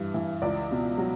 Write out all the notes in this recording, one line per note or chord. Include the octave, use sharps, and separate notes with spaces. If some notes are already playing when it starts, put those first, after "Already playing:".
Already playing: G2 E3
E3
C#2 D5
B2
F#3